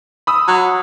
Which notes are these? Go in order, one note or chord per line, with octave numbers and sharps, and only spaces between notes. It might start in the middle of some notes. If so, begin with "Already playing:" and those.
B5 D#6 E6
F#3